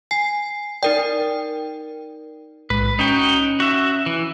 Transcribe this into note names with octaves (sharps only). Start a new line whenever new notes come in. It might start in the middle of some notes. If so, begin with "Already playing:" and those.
G#5 C7
D#4 A#4 D5 G5
B1 A2 G#3 B4
C#4 D#4 F#4 G5
F#4 E5
E3